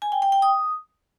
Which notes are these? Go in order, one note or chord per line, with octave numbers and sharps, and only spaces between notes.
G#5
G5
G5
G5
D#6